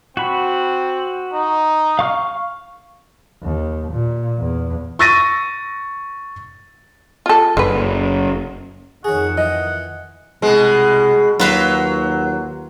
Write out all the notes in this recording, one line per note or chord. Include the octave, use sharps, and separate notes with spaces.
C4 F#4 B5
D#4
F5 C#6 F6
D#2
A#2
E2
C#6 E6 A6 A#6 D#7
F4 A4
F#1 D3 B4
F2 D#3 G#4 C#5 F#5
E3 D#5
C2 B2 G#3
D#2 F#3 F4 B4 F5